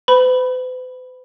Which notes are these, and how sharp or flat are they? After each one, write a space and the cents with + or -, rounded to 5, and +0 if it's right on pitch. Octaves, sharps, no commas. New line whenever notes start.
B4 +45 B5 +0